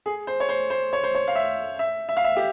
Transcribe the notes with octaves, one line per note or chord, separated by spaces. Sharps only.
G#4
C5
C#5
C5
C5
C#5
C5
C#5
F5
E5
E5
E5
F5
E5
G4